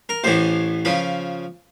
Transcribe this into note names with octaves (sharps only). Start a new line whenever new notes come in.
A#4
A1 A2 E3 C5
C#3 F3 B4